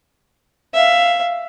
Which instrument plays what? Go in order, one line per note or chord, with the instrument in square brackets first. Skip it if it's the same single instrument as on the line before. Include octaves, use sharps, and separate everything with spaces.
[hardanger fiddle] E5 F5